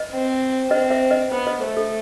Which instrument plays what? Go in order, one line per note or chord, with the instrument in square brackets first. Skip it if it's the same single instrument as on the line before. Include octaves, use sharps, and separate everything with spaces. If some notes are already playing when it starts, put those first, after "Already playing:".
Already playing: [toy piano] B4 D#5
[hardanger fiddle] C4
[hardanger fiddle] C4 [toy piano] B4 D#5
[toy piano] C5 E5
B4 D#5
[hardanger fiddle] B3 [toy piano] C5
[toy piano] B4 D#5
[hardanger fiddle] A3 [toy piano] C5
[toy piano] A4